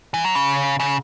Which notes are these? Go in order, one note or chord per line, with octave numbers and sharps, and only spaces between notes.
E3
F#3
C#3
C#3